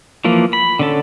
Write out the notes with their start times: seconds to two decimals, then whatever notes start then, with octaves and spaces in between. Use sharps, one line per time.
0.25 E3 F3 A#3
0.53 B5
0.79 D3 C#4 A4